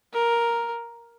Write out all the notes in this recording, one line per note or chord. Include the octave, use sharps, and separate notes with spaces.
A#4